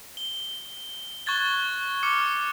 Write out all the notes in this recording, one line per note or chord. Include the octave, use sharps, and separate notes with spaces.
G7
C#6 F#6 G#6 A6 G7
D6 F6 C#7